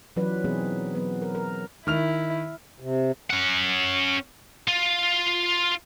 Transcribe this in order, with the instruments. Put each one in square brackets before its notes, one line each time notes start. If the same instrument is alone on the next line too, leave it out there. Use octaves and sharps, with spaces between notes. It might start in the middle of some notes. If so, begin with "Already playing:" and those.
[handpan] E3 F#3 C#4 F4 B4 D5
B2 E3 B3 C4 D#4 G#4
F#3 B3 B4
A#4
A#4
[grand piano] D#3 F6 F7 [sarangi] E4
[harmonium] C3
[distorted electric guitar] C#4 F#5
F4